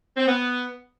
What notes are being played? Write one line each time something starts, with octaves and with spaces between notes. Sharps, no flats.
C4
B3